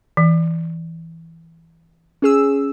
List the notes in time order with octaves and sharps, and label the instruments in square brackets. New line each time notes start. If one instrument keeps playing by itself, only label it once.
[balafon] E3
[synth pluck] C#4 G#4 E6